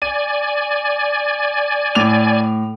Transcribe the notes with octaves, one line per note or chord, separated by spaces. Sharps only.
D5 G#5 D#7
A2 D6 F7